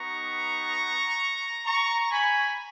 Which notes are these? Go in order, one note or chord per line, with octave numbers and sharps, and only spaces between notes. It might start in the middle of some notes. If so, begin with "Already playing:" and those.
Already playing: B3 D#4 G4 A#5 C#6
A#5 C#6
G#5 B5